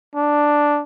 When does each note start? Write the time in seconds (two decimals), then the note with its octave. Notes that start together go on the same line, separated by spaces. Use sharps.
0.15 D4